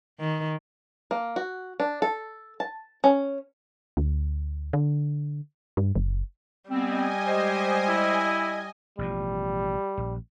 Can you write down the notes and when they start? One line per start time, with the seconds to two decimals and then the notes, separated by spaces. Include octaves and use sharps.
0.20 D#3
1.11 A#3
1.36 F#4
1.80 D4
2.02 A4
2.60 A5
3.04 C#4
3.97 D2
4.73 D3
5.77 G2
5.96 F#1
6.70 G3 B3 C4 D#5 G#5
7.26 G#3 G4 C5
7.88 E4
8.99 A1 B2 F3 G3
9.98 A#1